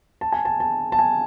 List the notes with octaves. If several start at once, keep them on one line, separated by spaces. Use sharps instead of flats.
A5
G#5
A5
A5
A5
G#5